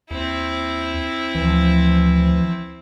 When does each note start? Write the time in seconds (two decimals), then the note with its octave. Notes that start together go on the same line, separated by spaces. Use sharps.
0.11 D#2 C4 E4
1.35 D2 E3 F3